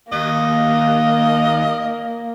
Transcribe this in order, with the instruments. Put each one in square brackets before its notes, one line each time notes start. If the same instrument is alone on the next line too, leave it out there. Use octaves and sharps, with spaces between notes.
[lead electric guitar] D#2 [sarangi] A#3 [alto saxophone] D#5